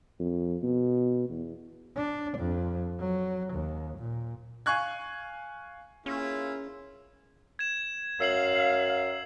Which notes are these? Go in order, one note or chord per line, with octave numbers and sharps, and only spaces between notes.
F2
B2
E2
D4
F2
F#3
D#2
A#2
F5 G#5 C#6 F#6 G#6
A#3 C#4 E4 F4 G#4
G#6 E7
F#2 F5 E6 C7 F#7